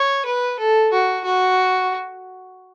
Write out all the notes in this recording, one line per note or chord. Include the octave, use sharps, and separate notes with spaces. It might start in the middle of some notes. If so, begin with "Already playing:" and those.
Already playing: C#5
B4
A4
F#4
F#4